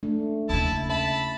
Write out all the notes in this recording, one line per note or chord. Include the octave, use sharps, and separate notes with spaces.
A3 D4
D#2 C#3 E4 A5
E5 A5 B5